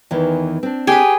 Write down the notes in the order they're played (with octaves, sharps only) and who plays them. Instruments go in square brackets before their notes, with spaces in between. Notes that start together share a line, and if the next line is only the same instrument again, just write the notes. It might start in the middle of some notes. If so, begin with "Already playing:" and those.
[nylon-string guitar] E2 D#3 E3
C4 D4
[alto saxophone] G4 [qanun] G#4 B4